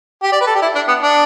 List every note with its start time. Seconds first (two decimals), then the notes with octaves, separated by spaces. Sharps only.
0.23 G4
0.32 D5
0.41 B4
0.47 A4
0.55 G4
0.62 E4
0.75 D4
0.88 B3
1.02 D4